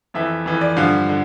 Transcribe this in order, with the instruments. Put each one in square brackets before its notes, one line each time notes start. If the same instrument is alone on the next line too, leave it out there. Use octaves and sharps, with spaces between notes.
[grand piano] F2 E3 E5
F2 E3
D5
G2 D3 F3 F5
D3